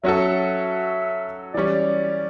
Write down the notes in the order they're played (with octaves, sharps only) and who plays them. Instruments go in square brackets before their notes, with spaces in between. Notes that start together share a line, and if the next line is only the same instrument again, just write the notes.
[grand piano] F#3 C#4 F#4 A4 [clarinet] E5
[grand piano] E3 G3 C#4 [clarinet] D5